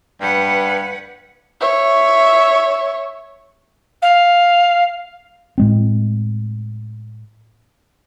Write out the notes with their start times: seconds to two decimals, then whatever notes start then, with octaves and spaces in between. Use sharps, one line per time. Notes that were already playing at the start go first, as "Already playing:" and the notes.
0.21 G2 B4 F#5
1.61 C#5 E5
4.02 F5
5.58 A2 G#3 C4